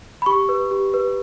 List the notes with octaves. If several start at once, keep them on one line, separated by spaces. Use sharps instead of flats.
B5
G4 C#6
B4
G4
B4